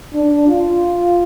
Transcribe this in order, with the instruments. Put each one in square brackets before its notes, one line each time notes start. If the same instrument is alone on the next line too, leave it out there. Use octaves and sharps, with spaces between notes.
[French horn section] D4
F4